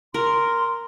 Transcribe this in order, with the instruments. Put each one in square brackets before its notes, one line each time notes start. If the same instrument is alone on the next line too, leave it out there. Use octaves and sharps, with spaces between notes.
[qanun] A#4 [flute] C6